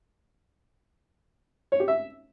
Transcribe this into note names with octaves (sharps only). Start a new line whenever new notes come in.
C#5
G4
E5